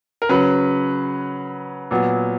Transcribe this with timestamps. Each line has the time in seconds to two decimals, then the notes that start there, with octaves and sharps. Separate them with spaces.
0.22 A#4
0.29 C#3 F#3 C#4 B4
1.91 A#2 F#3 B3